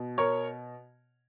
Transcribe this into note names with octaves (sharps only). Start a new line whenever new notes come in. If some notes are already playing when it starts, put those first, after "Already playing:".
Already playing: B2
A#4 C#5